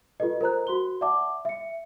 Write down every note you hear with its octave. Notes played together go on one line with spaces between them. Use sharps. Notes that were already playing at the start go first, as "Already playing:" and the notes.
F4 G4 A4 B4 D#5
A#4 C5 A#5 F#6
F#4 C6 G7
D5 E5 F#5 A5 D6
E5 C#7